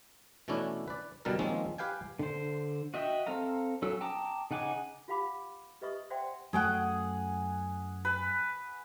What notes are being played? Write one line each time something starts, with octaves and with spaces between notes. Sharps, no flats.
B2 E3 A3 C#4 D4 E4
B4 D5
B2 D3 G3 A4 A#4
D#3 F3 G#3 A#3 C4 C#4
G4 B4 F5 G5 G#5
D3 C5
F#4 D#5 E5 G5
C4 A4 F5 A#5
F#3 C#4 A4 E6
G5 A5 A#5 D6 D#6
C#3 D#4 F#5 G#5 D6
F4 G4 F5 F#5 B5 D6
G4 B4 D#5 E5 C#6 D#6
C5 D5 E5 F#5 G5 C6
F#2 A3 G#4 F#5 G5
B4